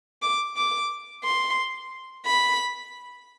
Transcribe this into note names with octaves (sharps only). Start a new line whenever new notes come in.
D6
D6
C6
B5